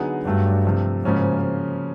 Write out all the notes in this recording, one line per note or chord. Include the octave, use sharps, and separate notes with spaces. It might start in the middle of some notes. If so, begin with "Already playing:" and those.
Already playing: D3 F#3 B3 D#4 G#4
G2 F#3 A3 D4
C3 F3 A3
G#2 C#3 F3 A#3 C#4 F#4